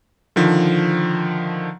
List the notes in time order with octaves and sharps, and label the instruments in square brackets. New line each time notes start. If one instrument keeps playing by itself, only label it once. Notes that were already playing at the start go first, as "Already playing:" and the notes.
[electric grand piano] D3 D#3 F3